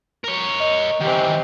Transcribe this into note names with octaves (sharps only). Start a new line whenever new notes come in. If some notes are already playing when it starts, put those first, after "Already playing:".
A#4 C#5
D#5
D#3 E3 C4 G4 D#5